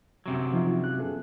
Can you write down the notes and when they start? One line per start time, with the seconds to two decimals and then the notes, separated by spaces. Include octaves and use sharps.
0.26 F#2 C3 F#3
0.53 F3 D#4 F4
0.84 F#6
0.98 B3 G#4 A4